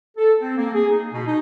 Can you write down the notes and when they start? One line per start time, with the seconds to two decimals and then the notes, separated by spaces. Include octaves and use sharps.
0.16 A4
0.40 C4
0.58 A#3
0.73 G#4
0.88 D#4
1.11 B2
1.25 D#4